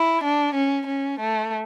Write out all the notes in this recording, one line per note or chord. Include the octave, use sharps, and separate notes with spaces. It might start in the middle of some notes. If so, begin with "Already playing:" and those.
Already playing: E4
D4
C#4
C#4
A3